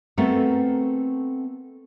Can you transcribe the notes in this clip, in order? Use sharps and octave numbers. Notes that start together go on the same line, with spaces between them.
A3 B3 C4 F#4 A4 A#4